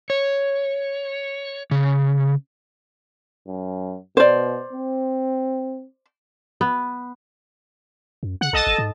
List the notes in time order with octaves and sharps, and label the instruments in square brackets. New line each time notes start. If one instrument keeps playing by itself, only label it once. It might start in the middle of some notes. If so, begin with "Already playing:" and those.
[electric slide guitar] C#5
C#3
[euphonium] F#2
[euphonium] B2 [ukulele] C5 D5
[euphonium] C4
[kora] B3
[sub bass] F#2
[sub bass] C#3 [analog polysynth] F#5
[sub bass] B1 [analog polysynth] A4 D#5 A5
[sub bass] G1
G#2